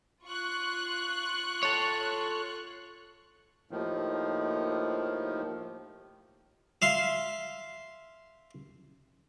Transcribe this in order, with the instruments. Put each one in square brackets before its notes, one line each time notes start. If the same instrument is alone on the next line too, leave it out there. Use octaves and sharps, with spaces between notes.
[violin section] F4 C#6 F#6
[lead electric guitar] A4 C#5
[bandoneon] D#2 A2 D#3 F3
[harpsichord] E5 F5 C6